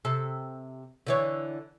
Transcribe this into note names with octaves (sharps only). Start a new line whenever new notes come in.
C3 A4
D3 E3 C#5